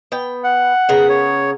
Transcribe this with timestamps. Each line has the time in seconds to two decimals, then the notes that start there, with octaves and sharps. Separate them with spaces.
0.12 B3 G5
0.44 F#5
0.89 C#3 B3 A#4
1.09 C#5